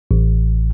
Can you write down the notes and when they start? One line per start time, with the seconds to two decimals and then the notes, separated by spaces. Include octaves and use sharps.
0.11 A1